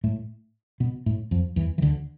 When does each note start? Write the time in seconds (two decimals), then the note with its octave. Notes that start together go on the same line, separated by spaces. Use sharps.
0.04 A2 A3
0.80 B2 B3
1.06 A2 A3
1.31 F2 F3
1.56 E2 E3
1.78 E3
1.82 D2 D3